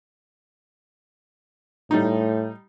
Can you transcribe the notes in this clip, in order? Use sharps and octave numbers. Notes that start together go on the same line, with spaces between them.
A2 G3 D#4